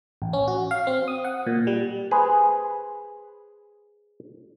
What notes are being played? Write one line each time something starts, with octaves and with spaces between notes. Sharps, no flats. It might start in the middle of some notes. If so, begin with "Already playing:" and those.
A1
C#4
F#4
F5
C4
D#6
F#5
A#2
G3
G#4 B4 C5